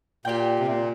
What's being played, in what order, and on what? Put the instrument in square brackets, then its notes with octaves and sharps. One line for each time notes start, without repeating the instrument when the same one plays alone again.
[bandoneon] A#2 [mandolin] G4 D5 G5
[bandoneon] C3
A#2